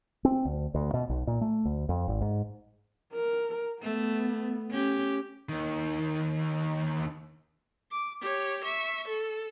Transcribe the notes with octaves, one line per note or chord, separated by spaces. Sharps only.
C4
D2
D2
B2
B1
A#2
A3
D2
F2
G#1
G#2
A#4
A3 B3
C#4 G4
D#2 D#3
D6
G4 C#5
E5 C#6
A4